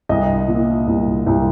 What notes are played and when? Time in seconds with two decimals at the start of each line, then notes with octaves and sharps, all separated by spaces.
0.09 C2 D#5
0.48 A#2
0.87 C2
1.26 C2